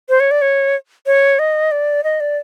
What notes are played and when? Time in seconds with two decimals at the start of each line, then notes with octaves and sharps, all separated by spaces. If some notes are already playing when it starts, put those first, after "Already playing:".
0.09 C5
0.20 C#5
0.31 D5
0.42 C#5
1.06 C#5
1.39 D#5
1.71 D5
2.04 D#5
2.20 D5